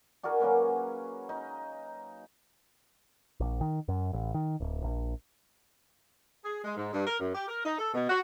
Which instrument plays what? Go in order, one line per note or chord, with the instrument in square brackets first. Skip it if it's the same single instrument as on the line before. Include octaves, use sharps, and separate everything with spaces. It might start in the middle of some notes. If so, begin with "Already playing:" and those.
[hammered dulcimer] D4 F#4 G#4 A#4
F#3 A#3 C#4 B4
D#4
[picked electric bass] A#1
D#3
F#2
A1
D#3
D1
A#1
[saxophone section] G#4
G#3
G#2
G2
A#4
F#2
G4
A#4
D#4
A4
B2
F#4